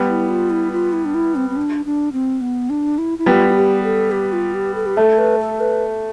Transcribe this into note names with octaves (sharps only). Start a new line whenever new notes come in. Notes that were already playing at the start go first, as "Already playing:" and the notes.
Already playing: G3 B3
E4
F4
E4
F4
E4
D4
E4
C4
C4
D4
D4
C4
B3
D4
E4
E4
G3 B3 F4
F4
G4
A4
G4
F4
G4
A4
G4
A3 A4
B4
A4
B4